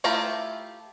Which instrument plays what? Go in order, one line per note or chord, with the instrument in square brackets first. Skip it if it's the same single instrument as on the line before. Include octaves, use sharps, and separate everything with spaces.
[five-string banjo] A3 E4 F4 G4 A#5